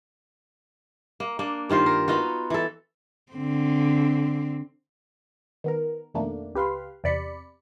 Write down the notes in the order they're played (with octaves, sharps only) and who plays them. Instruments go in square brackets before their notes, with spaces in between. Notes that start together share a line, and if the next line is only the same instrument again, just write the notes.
[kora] A#3
A#3 D4
G2 D#3 F4 C5
A#4
B3 D#4 F4 F#4
E3 A4
[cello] D3 C4
[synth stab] D#3 B3 A#4
F2 B2 D#3 A3 A#3 D4
C#2 G4 B4 F5 C6
E2 C3 D5 B5 C#7